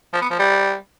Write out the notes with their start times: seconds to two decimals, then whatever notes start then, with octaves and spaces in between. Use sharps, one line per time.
0.13 F3
0.22 B3
0.30 F3
0.39 G3